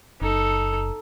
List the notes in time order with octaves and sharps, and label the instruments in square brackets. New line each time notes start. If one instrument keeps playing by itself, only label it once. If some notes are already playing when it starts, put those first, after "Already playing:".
[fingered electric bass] F#1 [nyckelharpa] D#4 A4